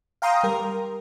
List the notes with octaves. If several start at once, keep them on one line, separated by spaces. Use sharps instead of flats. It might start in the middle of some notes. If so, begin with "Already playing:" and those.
F5 G5 A#5 C6 D#6
G3 A#4